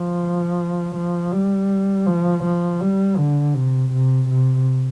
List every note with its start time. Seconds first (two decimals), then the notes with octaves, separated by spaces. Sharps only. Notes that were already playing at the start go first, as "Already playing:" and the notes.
Already playing: F3
0.95 F3
1.31 G3
2.06 F3
2.44 F3
2.81 G3
3.17 D3
3.54 C3
3.92 C3
4.29 C3